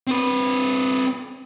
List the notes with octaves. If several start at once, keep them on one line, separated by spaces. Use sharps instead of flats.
C4 B4